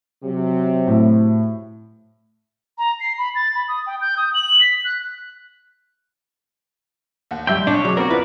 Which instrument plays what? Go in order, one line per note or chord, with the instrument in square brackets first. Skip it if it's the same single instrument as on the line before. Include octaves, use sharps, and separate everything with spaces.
[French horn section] C3 F#3
[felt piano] A2
[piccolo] A#5
C7
B5
A6
B5
D#6
G5
G6
D#6
F#7
B6
F#6
[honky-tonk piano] D#2 F#5
[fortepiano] G3 E5 C6 [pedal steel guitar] G5
[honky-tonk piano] B1 [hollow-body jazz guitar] D4 [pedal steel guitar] C#5
[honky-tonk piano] C#3 D6 [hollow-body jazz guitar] F#3
[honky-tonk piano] B3 C4 [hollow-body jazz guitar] F#4 A#4 [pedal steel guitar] D5
[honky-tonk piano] F3 [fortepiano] E4 F4 [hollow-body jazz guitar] B4